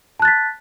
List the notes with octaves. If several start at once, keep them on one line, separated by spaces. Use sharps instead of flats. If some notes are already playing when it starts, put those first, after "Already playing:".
A5 F#6 A6 B6